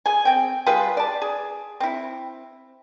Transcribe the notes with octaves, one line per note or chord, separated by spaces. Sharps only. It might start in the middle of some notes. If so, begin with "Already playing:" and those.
G#4 G#5
C4 G5
G3 F4 G#4 B4
D5 A5
G#4
C4 E4